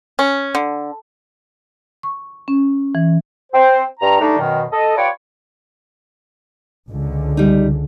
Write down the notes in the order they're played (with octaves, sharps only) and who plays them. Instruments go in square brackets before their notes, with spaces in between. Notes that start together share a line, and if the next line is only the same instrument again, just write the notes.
[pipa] C#4
D3
[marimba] C#6
C#4
E3
[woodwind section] C4 C5
G2 A#5
G3 A3 D4 D#4
F#2 B2 D#3
A4 D#5
F4 G4 B4 C#5 D5
[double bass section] C#2 D3
[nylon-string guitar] G3 D#4